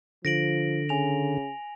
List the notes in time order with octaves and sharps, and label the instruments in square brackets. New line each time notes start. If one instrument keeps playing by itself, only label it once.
[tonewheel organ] D3 [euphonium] F3 [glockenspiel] A#6 D7 F#7
[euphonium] C#3 [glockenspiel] G#5 F7